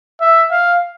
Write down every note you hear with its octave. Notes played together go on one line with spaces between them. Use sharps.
E5
F5